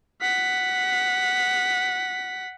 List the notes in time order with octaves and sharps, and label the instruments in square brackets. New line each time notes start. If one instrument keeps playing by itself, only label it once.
[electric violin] F#5 B6